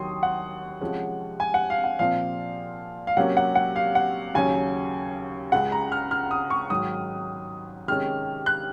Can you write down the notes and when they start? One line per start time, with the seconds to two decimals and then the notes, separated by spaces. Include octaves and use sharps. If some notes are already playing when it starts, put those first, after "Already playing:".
Already playing: D#2 D#3 F#3 C6 D#6
0.23 F#5
0.81 C3 F3 G#3 C#4
1.40 G#5
1.54 F#5
1.70 F5
1.84 F#5
1.99 A#2 F3 C4 F5
3.07 F5
3.17 C3 F#3 A#3 C#4 F#5
3.37 F#5
3.55 F#5
3.76 F5
3.95 F#5
4.35 D#2 C#3 F#3 C#4 G#5
5.52 C#2 C#3 G#3 F#5
5.72 A#5
5.92 F6
6.11 F6
6.31 D#6
6.50 C#6
6.70 G#2 D#3 F#3 D#6
7.88 C3 D#3 G#3 C#4 F6
8.46 F#6